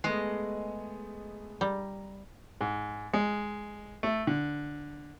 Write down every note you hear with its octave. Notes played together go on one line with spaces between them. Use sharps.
G#3 A3 B3 G#4 D#5
G3 A#5
G#2
G#3
A3
D3